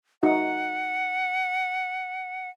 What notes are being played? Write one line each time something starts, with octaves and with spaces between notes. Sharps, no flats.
D#4 F#4 E5 F#5